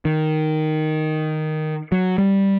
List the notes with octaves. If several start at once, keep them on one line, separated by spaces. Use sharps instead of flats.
D#3
F#3
G3